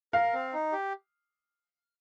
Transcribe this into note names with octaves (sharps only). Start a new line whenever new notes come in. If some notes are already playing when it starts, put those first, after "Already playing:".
A#4 F5
C4
D#4
G4